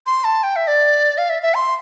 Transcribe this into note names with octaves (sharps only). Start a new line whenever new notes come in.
C6
A5
G5
E5
D5
F5
E5
E5
C6